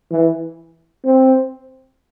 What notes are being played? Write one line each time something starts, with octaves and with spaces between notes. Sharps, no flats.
E3
C4